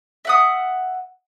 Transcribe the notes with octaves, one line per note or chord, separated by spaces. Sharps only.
E5 F#5 D#6